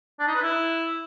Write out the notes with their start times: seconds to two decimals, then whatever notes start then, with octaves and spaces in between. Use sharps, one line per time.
0.20 D4
0.27 D#4
0.35 B4
0.43 E4